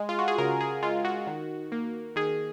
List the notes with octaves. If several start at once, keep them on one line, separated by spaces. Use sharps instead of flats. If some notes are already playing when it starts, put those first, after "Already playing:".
Already playing: G#3 G#5
F4
F#4
G#4
C#3 A#4
G#4
G#3 F4
F#4
D#3
A#3
D#3 G#4